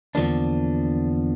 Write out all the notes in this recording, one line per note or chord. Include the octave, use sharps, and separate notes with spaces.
E2 D3 F3 A#3 D4